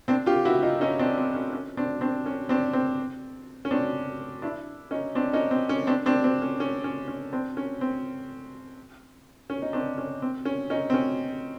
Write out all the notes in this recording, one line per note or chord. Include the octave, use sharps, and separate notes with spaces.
C4 D4
F4 G4
E4 F#4
D#4 F4
C#4 D#4
C4 D4
C4
C#4
C#4
C4 D4
C4 D4
C#4
C4 D4
C4
C#4
C4 D4
D4 E4
C#4 D#4
C4 D4
C#4 D#4
C4
C#4
C4 D4
C4 D4
C4
C#4
C#4
C#4
C#4
C4 D4
C#4
C4
C#4
D#4
C4 D4
C#4
C4
C#4
C#4 D#4
C4
C#4